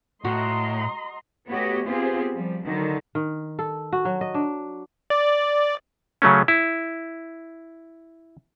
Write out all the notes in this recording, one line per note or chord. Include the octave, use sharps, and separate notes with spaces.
A2 F#4 D#5 A#5 C6
A3 B3 F#4 G4 C#5 D#5
B3 C4 F4 G4 G#4 C5
F3 G3
D3 D#3 F#3
D#3
A4
F#4
F#3
D#5
D4
D5
C#3 F#3 A3 C#4
E4